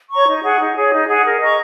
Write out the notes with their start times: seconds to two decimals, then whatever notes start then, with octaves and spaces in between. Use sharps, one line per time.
0.10 C#5 A#5 C#6
0.27 D#4
0.43 G#4 F#5
0.59 D#4
0.75 G#4 C#5
0.92 D#4
1.07 G#4 F#5
1.24 A#4
1.40 D#5 A#5 C#6